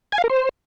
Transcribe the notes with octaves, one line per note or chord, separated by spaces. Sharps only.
G#5
F5
A#4
C5